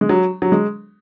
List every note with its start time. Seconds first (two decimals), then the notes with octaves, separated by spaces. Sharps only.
0.01 G#3
0.09 F#3
0.42 F#3
0.52 G#3